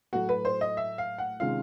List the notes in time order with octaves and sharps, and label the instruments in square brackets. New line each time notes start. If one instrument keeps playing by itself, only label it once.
[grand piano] A2 F#3 A3 [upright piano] F#4
[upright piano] B4
C5
D#5
E5
F5
F#5
[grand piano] C3 D#3 G#3 C#4 F4 [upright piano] F5